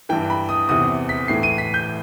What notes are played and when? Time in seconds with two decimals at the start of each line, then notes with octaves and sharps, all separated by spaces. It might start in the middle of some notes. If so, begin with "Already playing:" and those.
0.09 G2 E3 G5
0.30 B5
0.49 D#6
0.69 E2 C3 E3 D#6
1.09 B6
1.28 A2 E3 C7
1.43 D#7
1.58 B6
1.74 G6